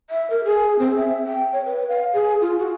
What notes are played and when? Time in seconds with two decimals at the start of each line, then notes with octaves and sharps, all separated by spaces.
0.10 E5
0.30 A#4
0.45 G#4
0.79 C4
0.97 E5
1.27 G5
1.53 C#5
1.65 B4
1.88 F5
2.13 G#4
2.41 F4
2.59 F#4